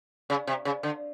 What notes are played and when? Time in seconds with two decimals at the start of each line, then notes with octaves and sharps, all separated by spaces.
0.30 C#3
0.47 C3
0.65 C#3
0.83 D3